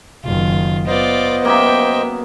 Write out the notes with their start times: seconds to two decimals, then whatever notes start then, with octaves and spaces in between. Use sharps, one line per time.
0.24 F#1 D#3 F4
0.87 B3 F4 C5 D5 D#5
1.44 F#2 A#3 G#4 E5 G5